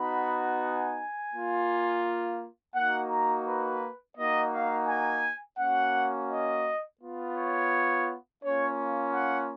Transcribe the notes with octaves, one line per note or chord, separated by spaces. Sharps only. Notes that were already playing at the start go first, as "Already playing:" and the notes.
Already playing: B3 D#4 F#4 B5
G#5
A#3 F4
A#3 D#4 F#4 F#5
A#5
B4
A#3 D#4 F#4 D#5
F5
G#5
A#3 C#4 F#4 F#5
D#5
B3 F4
C#5
A#3 C#4 F4 C#5
F#5